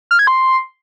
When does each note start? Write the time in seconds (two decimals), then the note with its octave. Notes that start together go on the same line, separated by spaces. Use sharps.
0.11 F6
0.19 G#6
0.27 C6